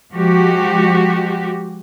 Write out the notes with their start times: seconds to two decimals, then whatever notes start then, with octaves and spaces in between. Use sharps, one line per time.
0.13 F3 G#3 F#4 G4